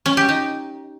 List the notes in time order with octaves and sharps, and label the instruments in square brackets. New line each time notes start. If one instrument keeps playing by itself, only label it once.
[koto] C#4
G4
D#4